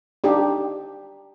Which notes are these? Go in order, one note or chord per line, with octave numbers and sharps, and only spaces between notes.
D4 D#4 G4